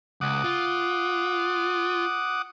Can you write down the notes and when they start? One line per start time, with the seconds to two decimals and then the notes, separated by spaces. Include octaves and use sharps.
0.21 C#2 F#5 D6 D#6
0.44 F4